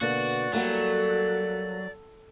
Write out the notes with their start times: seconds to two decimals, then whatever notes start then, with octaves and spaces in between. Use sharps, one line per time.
0.01 B2 D3 A#3 F#4 D5
0.53 F#3 G3 A3 A#3 F#4